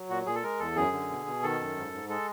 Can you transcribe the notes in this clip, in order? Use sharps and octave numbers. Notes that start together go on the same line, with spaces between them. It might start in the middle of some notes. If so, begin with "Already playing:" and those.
Already playing: F#3
A#2 F#4
A#2 G#4
A4
G#3 A#4
E2 A4
F#2 G#4
D3
B2
B2
D#3 A4
F#2
G#2
G#2
G#3 A4